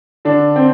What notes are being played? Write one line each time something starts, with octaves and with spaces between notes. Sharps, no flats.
D3 D4
C4